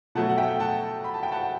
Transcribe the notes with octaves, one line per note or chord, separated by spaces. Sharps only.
B2 F#3 A3 F#5 A5
F#5
E5 G5
F#5 A5
B5
A5
G5
F#5 A5